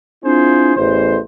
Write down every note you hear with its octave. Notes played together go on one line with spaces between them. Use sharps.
C4 D4 E4 F4 G#4 C5
A1 E2 C5